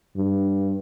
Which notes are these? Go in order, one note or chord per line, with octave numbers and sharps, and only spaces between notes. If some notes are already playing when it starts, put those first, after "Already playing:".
G2